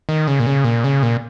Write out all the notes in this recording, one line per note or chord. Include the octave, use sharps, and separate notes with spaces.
D#3
C#3
A#2
C#3
A#2
C#3
A#2